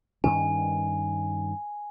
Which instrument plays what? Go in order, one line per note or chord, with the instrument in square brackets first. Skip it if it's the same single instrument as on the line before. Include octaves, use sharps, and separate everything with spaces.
[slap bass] G2 D#3 C#4 [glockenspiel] G#5